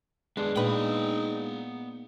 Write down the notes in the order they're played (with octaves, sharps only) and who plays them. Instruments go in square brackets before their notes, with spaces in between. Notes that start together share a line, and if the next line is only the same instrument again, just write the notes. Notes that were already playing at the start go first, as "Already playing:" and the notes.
[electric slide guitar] F#2 B3 [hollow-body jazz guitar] G#3 D4
[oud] A#2 B4 [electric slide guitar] B3 G5 [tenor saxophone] D#4